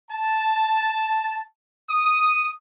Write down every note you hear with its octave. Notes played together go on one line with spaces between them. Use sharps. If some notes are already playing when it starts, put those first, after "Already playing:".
A5
D#6